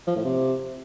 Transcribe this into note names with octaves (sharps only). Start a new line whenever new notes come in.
F3
A2
C3